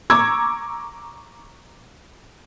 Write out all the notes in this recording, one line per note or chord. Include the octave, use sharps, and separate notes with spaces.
A#5 C#6 D6 E6 G#6